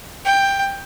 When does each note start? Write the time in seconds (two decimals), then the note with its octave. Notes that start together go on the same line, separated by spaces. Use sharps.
0.25 G5